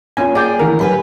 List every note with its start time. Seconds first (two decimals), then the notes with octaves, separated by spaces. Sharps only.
0.17 A#3 C#4 F4 G#5
0.35 G#4 D5 G5
0.59 D3 E3 A3 A#4
0.79 F#3 G4 B4 F#5 G#5 B5